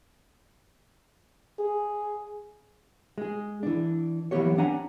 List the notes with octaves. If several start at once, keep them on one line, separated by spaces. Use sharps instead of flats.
G#4
G#3 G#4
E3 D4
E3 F#3 A#3 B3 G4 C#5
C4 D4 F#5 G#5 A#5